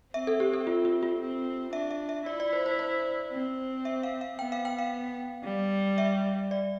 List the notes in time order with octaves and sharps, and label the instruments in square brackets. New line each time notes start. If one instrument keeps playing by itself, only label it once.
[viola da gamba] C4 [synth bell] E5
[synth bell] A4
G4
A4
F4
F4
F4
[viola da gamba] C4
[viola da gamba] D4 [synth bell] E5
[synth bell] E5
E5
[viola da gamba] E4 [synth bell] D5
[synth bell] D5
C5
C5
C5
[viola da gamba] C4
[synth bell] E5
F5
F5
[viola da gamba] B3 [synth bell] G5
[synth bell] F5
G5
F5
[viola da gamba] G3
[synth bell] E5
D5